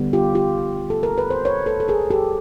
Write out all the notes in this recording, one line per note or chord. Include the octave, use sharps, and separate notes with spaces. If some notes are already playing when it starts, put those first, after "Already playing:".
Already playing: D3 G3 B3
F4 G4
F4 G4
A4
A#4
B4
C5
B4 C#5
A4 B4
A4
G#4 A#4
G4 A4